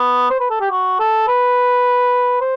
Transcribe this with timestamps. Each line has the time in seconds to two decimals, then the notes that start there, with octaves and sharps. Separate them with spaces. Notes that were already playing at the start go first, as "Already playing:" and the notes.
Already playing: B3
0.30 C5
0.40 B4
0.50 A4
0.61 G4
0.71 F#4
1.00 A4
1.28 B4
2.41 C5